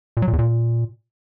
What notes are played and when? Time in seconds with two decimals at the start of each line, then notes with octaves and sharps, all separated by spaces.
0.17 A#2
0.22 F#3
0.28 A#2
0.33 E2
0.39 A#2